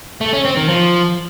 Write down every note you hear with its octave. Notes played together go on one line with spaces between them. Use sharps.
A3
C#4
C4
D#3
F3